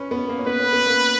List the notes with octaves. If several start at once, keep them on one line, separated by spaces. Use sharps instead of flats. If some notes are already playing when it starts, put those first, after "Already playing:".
Already playing: C#4 B4 C#5
B3
A#3
C#4
B3 B4
C#4
B3
A#3